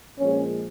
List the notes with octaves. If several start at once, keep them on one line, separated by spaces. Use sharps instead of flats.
A#1 A#2 F3 G#3 C#4